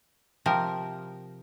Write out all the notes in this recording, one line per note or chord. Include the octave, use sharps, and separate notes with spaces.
C3 F3 G4 A#4